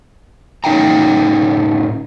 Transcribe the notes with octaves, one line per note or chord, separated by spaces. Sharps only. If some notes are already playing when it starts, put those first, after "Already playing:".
A2 C#4 D#4 F5 G5 A#5